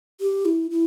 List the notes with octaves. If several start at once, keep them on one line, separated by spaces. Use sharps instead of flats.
G4
E4
E4